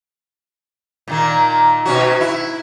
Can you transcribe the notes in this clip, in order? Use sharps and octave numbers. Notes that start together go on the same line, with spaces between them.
A#2 D#3 A#3
B2 C#4 F#4
E4